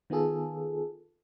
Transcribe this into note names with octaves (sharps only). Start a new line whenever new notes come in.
D#3 B3 F4 G#4 A4